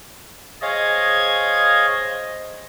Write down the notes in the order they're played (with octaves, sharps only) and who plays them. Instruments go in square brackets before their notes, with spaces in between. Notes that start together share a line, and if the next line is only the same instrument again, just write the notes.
[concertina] G#4 C#5 F5 [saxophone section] C5 D#5 [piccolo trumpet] G#6